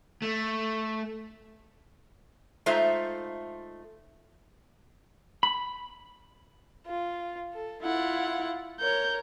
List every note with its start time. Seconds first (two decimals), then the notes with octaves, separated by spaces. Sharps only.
0.22 A3
2.66 G#3 A3 D#4 F4 C5 E5
5.43 B5
6.86 F4
7.53 A4
7.82 E4 F4 F#5
8.80 A#4 C#5 G6